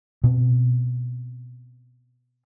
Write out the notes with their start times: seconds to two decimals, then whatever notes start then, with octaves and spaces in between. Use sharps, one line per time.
0.24 B2 C4